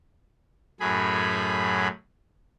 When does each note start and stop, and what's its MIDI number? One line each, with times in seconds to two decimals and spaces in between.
0.80 1.88 42
0.80 1.88 45
0.80 1.88 54
0.80 1.88 68
0.80 1.88 83